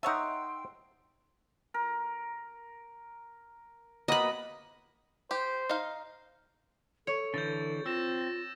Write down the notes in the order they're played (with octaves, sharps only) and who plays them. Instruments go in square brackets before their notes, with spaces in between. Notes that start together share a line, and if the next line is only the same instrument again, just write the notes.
[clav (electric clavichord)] D#4 E5 [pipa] A4 C#5 F#5 [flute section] G5 C6 E6
[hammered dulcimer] A#4
[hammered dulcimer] A#3 B3 F#4 [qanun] D#5 B5
[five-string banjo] G4 [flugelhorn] C5
[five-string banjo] D#4 F5
[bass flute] A4 [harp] C#5
[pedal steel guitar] D3 E3 [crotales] G6 A6
[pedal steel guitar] C4 [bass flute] F4 [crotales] E6 A#6 E7